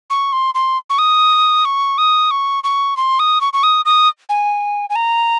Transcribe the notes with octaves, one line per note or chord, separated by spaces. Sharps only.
C#6
C6
C6
C#6
D#6
C#6
D#6
C#6
C#6
C6
D#6
C#6
C#6
D#6
D#6
G#5
G#5
A#5